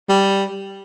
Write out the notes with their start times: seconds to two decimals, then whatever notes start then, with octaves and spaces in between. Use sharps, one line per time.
0.09 G3